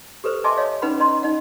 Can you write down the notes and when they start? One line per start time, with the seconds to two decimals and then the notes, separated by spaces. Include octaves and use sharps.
0.24 G4 A4 B4 C5
0.44 D#5 E5 G#5 A5 C6 D6
0.57 C#5 D#5 F5
0.82 C#4 D#4 B4 F#5 G5 B5
1.00 D#5 A#5 C6
1.23 D#4 D#5 F#5